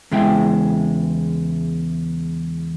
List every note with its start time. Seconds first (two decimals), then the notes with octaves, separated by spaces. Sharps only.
0.11 E2 C#3 G#3 E4 G5